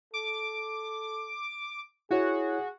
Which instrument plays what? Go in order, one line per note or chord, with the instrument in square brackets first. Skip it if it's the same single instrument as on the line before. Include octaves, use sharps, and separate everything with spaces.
[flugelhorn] A4 [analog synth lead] D6
[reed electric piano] E4 C#5 [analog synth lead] F#4 [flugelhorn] G#4